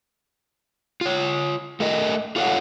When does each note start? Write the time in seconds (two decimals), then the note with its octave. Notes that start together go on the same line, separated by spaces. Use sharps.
1.01 F4 C#5
1.80 A3 A#4 D#5
2.36 F4 A4 C#5 F5 F#5